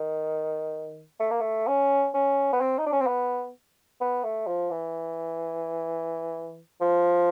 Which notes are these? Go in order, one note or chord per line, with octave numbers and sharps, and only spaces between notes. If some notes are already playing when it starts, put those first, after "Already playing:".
Already playing: D#3
A3
A#3
A3
C#4
C#4
B3
C4
D#4
D4
C#4
C4
B3
B3
A3
F3
E3
F3